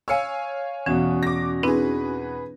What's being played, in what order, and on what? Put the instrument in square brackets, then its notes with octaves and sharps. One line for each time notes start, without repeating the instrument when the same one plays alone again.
[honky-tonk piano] C#5 F5 G#5 [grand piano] E6 C#7
[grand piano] E2 B2 [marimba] E3 [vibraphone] C#4 F#4
[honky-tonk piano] D6 A#6
[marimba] C4 D4 E4 [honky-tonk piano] G#4 B4